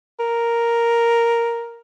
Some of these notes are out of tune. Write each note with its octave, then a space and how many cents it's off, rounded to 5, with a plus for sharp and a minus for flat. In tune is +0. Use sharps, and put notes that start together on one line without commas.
A#4 +0